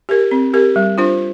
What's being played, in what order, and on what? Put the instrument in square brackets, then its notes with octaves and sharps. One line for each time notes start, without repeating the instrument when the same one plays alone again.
[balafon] G4 A#4
C4
G4 A#4
G3
D4 F4 C5